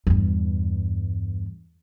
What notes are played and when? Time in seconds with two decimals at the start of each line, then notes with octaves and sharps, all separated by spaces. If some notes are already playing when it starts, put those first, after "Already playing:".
0.07 E2 G2